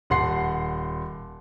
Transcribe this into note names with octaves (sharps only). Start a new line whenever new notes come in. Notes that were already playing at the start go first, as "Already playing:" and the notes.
D#1 F#5 C6 C7